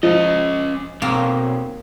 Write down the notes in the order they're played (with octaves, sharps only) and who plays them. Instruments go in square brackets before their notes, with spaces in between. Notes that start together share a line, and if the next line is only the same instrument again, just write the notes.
[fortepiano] F3 [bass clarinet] G#3 [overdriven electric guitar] C#4 D#5
[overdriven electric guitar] B1 [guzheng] A#3 [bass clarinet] C4